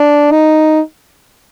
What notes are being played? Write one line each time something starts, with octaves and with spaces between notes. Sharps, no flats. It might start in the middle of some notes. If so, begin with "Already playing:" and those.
Already playing: D4
D#4